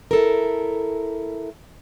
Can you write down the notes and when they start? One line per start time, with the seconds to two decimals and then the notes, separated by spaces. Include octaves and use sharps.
0.11 E4 A4 A#4